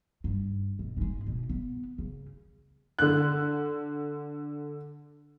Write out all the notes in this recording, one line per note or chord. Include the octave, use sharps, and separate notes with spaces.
G2
B2
G#2 G#3
B2
B3
C#3
D3 F#6